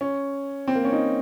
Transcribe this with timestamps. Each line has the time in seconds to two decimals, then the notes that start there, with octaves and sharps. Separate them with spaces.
0.01 C#4
0.68 C4
0.75 A#3
0.85 C#4
0.92 D#4